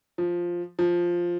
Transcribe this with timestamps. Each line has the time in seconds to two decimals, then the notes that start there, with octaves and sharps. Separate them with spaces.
0.18 F3
0.79 F3